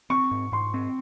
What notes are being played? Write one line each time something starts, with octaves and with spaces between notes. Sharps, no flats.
C4 C#6
G#2
G#2 C6
C4